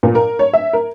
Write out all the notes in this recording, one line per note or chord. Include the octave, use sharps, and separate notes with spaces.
A#2
A#4
C#5
E5
A#4